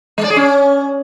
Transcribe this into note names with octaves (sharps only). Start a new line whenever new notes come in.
G#3
D5
G#4
C#4